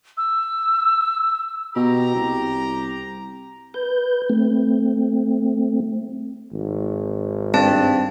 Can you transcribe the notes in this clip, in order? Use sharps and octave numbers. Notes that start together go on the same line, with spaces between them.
E6
B2 G4 A#5
C2
B4 G6
A3 C4
G#1
G2 C4 A5